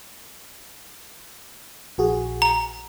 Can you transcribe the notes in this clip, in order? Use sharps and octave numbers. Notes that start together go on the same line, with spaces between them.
A#1 F#4 G#4
A#5